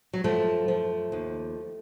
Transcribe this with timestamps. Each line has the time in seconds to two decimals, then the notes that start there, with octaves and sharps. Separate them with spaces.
0.13 F#3
0.24 F#2 F3 A3
0.68 F3
1.12 D#2